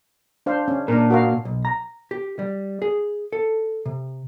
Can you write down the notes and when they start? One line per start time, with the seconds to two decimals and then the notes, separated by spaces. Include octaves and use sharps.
0.46 D4 C5 F5
0.68 C#4
0.88 A#2 D4 A#4
1.10 F#4 A#4 F5
1.45 B1
1.65 A#5
2.11 G4
2.39 G3
2.82 G#4
3.33 A4
3.86 C3